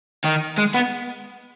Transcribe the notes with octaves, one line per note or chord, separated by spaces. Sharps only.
D#3
G#3
B3